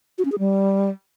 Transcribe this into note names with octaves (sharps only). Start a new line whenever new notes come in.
F#4
C#4
G#4
G3